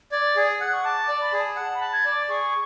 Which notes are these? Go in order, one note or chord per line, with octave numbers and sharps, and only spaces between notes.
D5 G#6
G#4 G#6
F#5 F#6
C#6
A5 D6
D6
D5
B5
G#4
A5
F#5 A5
B5
A5
G#6
D5
D6
G#4 C#6